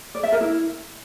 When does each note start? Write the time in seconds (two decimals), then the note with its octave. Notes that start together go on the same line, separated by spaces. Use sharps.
0.15 D5
0.23 E5
0.32 A#4
0.41 E4